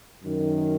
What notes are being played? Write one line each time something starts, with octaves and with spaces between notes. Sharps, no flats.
F#2 D#3